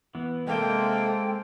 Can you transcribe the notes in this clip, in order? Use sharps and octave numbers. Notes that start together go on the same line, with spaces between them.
E3 B3
C3 G#3 A#3 A4 C5 G5